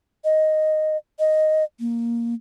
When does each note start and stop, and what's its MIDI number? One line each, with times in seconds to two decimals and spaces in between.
0.24 0.97 75
1.19 1.64 75
1.80 2.34 58